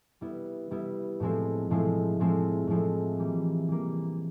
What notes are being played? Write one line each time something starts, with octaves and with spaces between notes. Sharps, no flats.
G3 B3 E4
G3 B3 E4
A2 F3 G#3 C4 E4
A2 F3 G#3 C4 E4
A2 F3 G#3 C4 E4
A2 F3 G#3 C4 E4
E3 G3 A#3
E3 G3 A#3